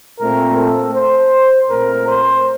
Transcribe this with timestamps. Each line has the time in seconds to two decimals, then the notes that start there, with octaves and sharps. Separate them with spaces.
0.20 A#2 A3 C4 A#4
0.57 A4
0.95 C5
1.70 A#2 A3 C4 A#4
2.07 C5